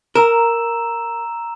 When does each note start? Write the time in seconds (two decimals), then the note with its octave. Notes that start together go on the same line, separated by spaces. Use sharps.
0.15 A#4 A#5 E6 E7